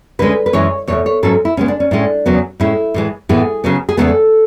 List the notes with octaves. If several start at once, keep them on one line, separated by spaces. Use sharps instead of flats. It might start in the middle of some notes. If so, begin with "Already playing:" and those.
D2 D3 G#3 C#4 B4
B4
F#2 E3 G#3 C#4 C#5
E2 B2 A3 C#5
C#5
G#2 F#3 C#4 A4
E4
C#3 G#3 B3 C#4
D4
C#4
A2 G#3 C#4 D4
E2 C#3 F#3 B3
A2 G#3 C#4 E4
A2 E3 G#3
A2 E3 B3 G#4
C#3 F#3 B3
G#4
E2 C#3 G#3 B3 A4